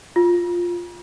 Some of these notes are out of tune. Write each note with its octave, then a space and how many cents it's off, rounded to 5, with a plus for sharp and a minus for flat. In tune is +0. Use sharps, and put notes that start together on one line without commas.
F4 +5